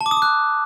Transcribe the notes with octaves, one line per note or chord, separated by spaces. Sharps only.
A5
D6
D#6
D6
F#6